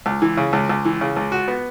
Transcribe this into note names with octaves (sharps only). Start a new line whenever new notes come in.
C#2
E3
C#3
C#2
C#2
E3
C#3
C#2
F#4
B3